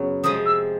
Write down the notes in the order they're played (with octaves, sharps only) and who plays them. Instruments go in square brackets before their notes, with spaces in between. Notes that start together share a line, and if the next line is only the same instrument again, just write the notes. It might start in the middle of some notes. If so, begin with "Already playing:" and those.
Already playing: [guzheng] F#2 C#3 F#3 B3 C#4
[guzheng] F2 C3 F3 G#3 [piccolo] D#6
[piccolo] E6